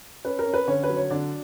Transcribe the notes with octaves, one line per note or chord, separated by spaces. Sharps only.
C#4 B4
A#4
C#4
B4
D3 C#4 C#5
B4
F#3
C#5
D3 D4 D5